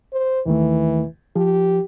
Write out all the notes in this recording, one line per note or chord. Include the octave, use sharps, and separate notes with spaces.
C5
D#2 D#3 E3 A3
F3 G4